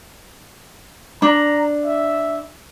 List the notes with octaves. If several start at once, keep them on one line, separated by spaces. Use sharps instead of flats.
D4 A#5
E5